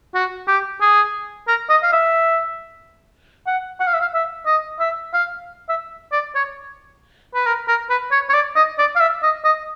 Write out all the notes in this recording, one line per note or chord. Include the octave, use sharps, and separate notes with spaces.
F#4
G4
G#4
A#4
D#5
F5
E5
F#5
F#5
F5
E5
F5
E5
D#5
E5
F5
E5
D5
C#5
B4
A#4
A#4
B4
C#5
C#5
D5
D#5
D5
F5
E5
D#5
D#5